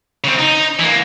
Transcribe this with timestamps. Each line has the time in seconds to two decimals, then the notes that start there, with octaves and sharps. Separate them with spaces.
0.24 C#3 C4
0.39 D#4
0.79 E3 A#3